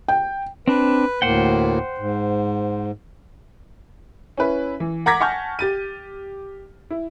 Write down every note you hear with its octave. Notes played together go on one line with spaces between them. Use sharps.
G5
C4 D4 B4
D2 A2 A#3 C5 F#5 G5
G#2
C#4 E4 B4
E3
F#5 A#5 D6 G#6 A#6 B6
F#5 G#5 A5 C#6 F6 G6
G4 A6 D#7
E4